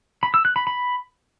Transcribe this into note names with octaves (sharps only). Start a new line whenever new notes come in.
B5
E6
F#6
B5
B5